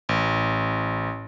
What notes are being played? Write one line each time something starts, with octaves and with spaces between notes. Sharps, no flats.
A1